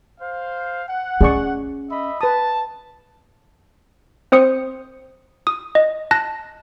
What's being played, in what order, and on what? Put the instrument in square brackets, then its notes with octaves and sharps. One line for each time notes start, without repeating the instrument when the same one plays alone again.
[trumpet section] C5 F5
F#5
[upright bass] C#4 [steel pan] G#4 D5 C#6
[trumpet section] D#5 E5 B5
[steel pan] B4 D#6 [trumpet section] A5
[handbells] C4 C5 D#6 C#7
D#6
D#5
A5 F#6 A#6